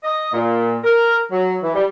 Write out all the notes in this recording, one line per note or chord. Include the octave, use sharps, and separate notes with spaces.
D#5
A#2
A#4
F#3
E3
G3